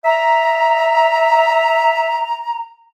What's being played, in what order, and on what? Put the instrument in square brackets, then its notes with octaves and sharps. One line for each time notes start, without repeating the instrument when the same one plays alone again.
[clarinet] E5 [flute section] A#5